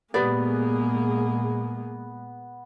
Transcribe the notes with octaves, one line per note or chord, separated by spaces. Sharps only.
A#2 G#3 A#3 B3 G4 G#4 B4 D5